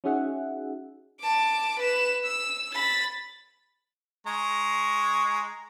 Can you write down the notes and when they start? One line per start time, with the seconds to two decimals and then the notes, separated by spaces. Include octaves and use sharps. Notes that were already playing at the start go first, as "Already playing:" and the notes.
0.04 C#4 D#4 F#4 G#4 E5 F#5
1.21 A5 D6
1.80 B4 E7
2.25 E6
2.75 B5 A6
4.27 G#3 A#5 C#6